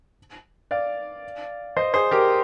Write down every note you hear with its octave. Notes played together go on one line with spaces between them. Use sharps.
D5 F5
C5 D#5
G#4 C5
G4 A#4